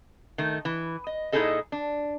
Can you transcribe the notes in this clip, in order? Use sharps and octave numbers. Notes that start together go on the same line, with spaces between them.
D#3 A3
E3
D#5
A#2 D#4 E4 G#4 A4 D#5
D4